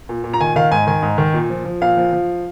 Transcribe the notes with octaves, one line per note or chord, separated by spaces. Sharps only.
A#2
A#2
A#5
D#3 G#5
D#3 F5
G#2 G#5
D#3 G#5
G#2
D#3
A#2
F3
F3
A#2 F5
F3
F3